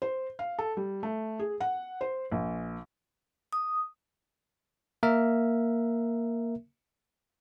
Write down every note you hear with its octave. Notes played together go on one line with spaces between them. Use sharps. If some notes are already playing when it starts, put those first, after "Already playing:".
C5
F5
A4
G3
A3
G#4
F#5
C5
A#1
D#6
A#3 A#4 E5